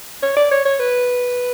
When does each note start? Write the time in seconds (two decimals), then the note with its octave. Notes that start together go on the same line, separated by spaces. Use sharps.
0.23 C#5
0.37 D5
0.51 C#5
0.66 C#5
0.80 B4